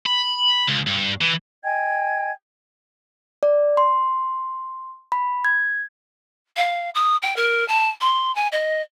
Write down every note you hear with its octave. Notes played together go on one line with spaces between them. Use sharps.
B5
C#2
G2
E3
D#5 G5 G#5 G#6
D5
C6
B5
G#6
F5
D#6
G5
A#4
A5
C6
G#5
D#5